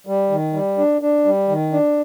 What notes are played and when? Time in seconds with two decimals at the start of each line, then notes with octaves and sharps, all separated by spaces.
0.07 G3
0.30 D#3
0.54 G3
0.78 D4
1.01 D4
1.25 G3
1.48 D#3
1.72 D4